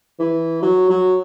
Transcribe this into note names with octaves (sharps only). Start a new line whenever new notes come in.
E3
F#3
F#3